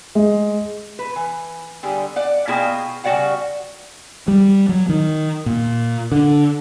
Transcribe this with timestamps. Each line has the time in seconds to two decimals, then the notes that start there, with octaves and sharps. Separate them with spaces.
0.15 G#3
0.99 B4
1.16 E3
1.83 D3 G3 G#4
2.16 D5 F#5
2.47 B2 A#3 E4 F4 G#4 G5
3.04 C#3 G3 F#4 D5 F#5 G5
4.28 G3
4.69 F#3
4.89 D#3
5.46 A#2
6.12 D3